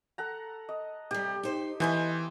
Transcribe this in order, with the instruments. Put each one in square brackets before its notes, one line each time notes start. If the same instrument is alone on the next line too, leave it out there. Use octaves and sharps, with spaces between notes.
[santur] A4 F#5 A#5
D#5
[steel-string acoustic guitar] C3 G3 [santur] G4
[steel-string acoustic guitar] D#4 C5
[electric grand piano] E3 [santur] B3 C5 [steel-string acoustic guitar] D#5 E5 G#5